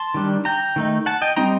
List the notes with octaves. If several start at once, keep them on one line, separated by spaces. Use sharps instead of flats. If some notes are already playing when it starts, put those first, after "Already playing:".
Already playing: A5 C6
D#3 G3 D4
G5 A#5
D#3 A3 D#4
F#5 A5
D#5 G5
G3 C4 D#4 G5 A#5